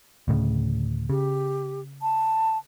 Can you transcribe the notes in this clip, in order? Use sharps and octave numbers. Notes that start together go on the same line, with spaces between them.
D2 A2 C#3
C#3 G4
A5